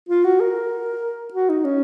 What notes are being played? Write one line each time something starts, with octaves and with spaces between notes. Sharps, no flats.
F4
F#4
A#4
F#4
D#4
C#4